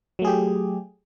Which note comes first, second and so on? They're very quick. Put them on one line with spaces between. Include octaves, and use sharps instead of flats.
F#3 A3 G#4 G4